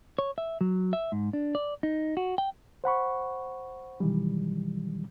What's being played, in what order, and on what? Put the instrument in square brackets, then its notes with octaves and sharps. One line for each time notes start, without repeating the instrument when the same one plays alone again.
[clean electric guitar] C#5
E5
F#3
E5
G#2
D4
D5
D#4
F#4
G5
[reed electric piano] C5 F#5 B5 C#6
B2 D#3 E3 F#3 G3